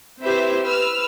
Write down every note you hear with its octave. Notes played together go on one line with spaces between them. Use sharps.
C4 E4 G4 B4 C5 E5
B4 E6 F6